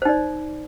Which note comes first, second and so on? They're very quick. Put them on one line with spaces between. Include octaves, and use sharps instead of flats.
C5 D#4 D5